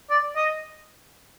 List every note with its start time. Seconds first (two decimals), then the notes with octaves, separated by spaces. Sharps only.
0.10 D5
0.36 D#5